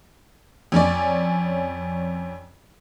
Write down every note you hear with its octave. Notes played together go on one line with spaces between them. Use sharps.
F2 C#4 C#5 D5